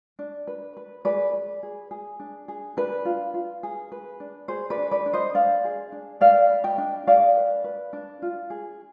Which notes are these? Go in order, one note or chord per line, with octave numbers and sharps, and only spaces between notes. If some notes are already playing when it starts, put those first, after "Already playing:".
D4
B4
B4
G#4 B4 D5
B4
G#4
G#4
D4
G#4
D4 B4
F4
F4
G#4
B4
D4
G#4 C5
B4 D5
D4
B4 D5
D4
C5 D#5
D4 D5 F5
G#4
D4
B4 D5 F5
B4
D#5 G5
D4
G#4 D5 F5
B4
B4
D4
F4
G#4